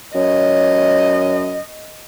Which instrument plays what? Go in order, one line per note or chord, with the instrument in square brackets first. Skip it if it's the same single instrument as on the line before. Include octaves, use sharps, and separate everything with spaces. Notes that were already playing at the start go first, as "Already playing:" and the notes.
[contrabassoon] F#2 [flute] C#5 [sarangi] D#5